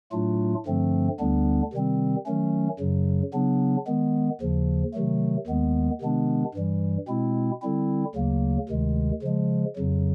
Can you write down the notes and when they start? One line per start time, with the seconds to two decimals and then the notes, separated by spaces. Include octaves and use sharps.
0.12 A2 F#3 A3 D4 F4
0.66 G2 D3 F3 A3 C4
1.19 D2 D3 G3 B3 D4
1.73 C3 D#3 G3 C4
2.26 D#3 F#3 A3 C#4
2.79 F#2 C#3 F#3
3.34 C#3 F#3 B3 D4
3.87 D#3 G#3 B3
4.41 D#2 C#3 F3
4.94 C3 D#3 F#3 A3
5.47 D#2 D#3 G#3 B3
6.01 C3 D#3 G#3 B3 D4
6.54 G2 E3 G3
7.08 B2 G#3 C4 E4
7.62 D3 G3 C4 E4
8.15 D2 C#3 F#3 A#3
8.69 D2 C3 D#3 G#3
9.22 C#3 F3 G#3
9.76 F2 C#3 F#3